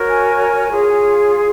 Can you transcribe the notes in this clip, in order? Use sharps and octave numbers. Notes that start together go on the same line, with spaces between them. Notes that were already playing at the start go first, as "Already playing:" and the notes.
Already playing: F#4 A#4 C#5
G#5
F4 G#4 C#5